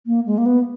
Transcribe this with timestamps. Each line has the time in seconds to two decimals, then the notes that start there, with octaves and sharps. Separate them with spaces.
0.06 A#3
0.26 G#3
0.38 A#3
0.46 B3